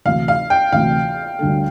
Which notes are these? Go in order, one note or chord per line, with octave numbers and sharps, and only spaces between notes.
D2 C3 E3 A3 F5
F5
G5
D2 C3 E3 A3 F5
D2 D3 G3 D4 A4